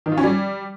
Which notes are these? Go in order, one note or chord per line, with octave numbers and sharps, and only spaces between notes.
D#3
F4
C#4
G3